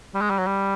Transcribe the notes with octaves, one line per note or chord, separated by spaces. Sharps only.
G3
G#3
G3
F#3
G3